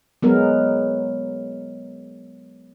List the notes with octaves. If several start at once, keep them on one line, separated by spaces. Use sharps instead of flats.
F#3 G#3 B3 A#4